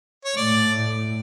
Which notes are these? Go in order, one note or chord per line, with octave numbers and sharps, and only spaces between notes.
C#5
A2 D5